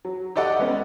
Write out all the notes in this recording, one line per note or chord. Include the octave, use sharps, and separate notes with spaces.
F#3
G4 A4 D5 D#5 F#5
G#3 B3 C#4